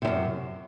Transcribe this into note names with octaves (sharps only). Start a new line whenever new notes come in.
F#2 A2 C3